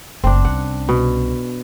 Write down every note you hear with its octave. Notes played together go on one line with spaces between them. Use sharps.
F#1 A3 C4 D4
C2 C#4 F#5
B2